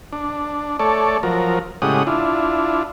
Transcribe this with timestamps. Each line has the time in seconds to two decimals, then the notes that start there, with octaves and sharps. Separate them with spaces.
0.13 D4
0.79 A3 A4 C#5 D5
1.23 F3 F#3 A#4
1.82 A2 C#3 G#3 G4 F#5 D#6
2.07 D4 E4 F4